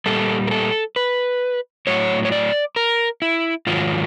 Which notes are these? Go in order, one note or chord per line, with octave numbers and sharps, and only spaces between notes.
A#2 G3 A4
A#4
A4
B4
A2 F#3 C#5
C#5
D5
A#4
E4
G#2 D#3 F#3 F4